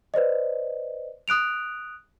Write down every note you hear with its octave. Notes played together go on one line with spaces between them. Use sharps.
B4 C5 D5 D#5
D#6 F#6 D7 F7